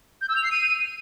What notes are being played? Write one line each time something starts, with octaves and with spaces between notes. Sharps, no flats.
G6
E6
F7
C7
D#7